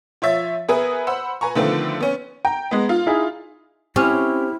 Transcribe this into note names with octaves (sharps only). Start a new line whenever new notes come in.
F3 C#5 E5 A6
B3 G#4 A#4 B4 E5
C5 F#5 B5 E6
B4 G#5 A#5 C#6
D3 D#3 F3 A3 B3 C4
B3 C#4
G5 A#5
G#3 B3
F4
D#4 E4 G#4
C4 C#4 E4 G4 F6